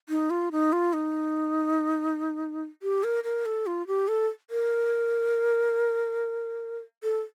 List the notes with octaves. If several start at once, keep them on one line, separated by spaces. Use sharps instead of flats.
D#4
F4
D#4
F4
D#4
G4
A#4
A#4
A4
F4
G4
A4
A#4
A4